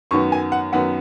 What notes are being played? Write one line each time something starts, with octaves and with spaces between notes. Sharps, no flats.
F#2 D#3 B3 C#6
G#5
F#5
F#2 D#3 B3 F#5